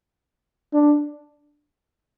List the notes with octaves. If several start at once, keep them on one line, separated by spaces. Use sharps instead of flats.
D4